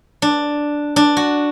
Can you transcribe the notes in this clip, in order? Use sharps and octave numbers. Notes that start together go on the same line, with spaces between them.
D4
D4
F#4